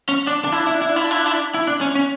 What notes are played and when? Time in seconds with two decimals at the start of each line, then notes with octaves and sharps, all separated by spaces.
0.09 C#4
0.27 D4
0.44 D4
0.52 E4
0.60 D4
0.67 E4
0.74 D4
0.82 E4
0.89 D4
0.96 E4
1.04 D4
1.11 E4
1.19 D4
1.26 E4
1.33 D4
1.54 E4
1.67 D4
1.81 C#4
1.95 C#4